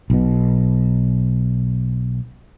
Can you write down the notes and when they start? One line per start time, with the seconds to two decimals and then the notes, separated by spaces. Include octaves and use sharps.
0.10 B1 B2